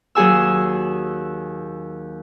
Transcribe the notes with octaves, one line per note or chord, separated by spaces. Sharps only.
D#2 F#3 G#4 G#5 E6